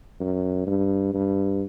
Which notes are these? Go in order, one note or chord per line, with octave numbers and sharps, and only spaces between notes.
F#2
G2
G2